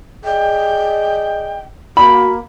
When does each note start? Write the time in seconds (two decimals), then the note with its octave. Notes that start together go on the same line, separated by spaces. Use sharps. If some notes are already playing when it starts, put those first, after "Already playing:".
0.25 G#4 D5 D#5 G5
1.97 A#3 F#4 B5